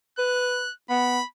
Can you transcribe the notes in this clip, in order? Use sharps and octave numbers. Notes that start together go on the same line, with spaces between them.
B4 F#6
B3 B5